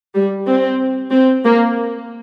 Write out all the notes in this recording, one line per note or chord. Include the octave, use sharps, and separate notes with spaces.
G3
C4
C4
A#3